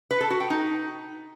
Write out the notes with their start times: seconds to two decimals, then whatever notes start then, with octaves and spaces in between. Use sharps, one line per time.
0.11 B4
0.20 A4
0.30 F#4
0.40 G5
0.50 D#4